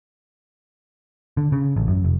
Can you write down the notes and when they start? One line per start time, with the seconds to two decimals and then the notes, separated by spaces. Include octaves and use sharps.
1.37 D3
1.52 C#3
1.76 A1
1.88 F#2
2.04 F1